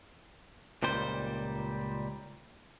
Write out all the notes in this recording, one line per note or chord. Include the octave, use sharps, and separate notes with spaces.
C#2 A#2 G3 C5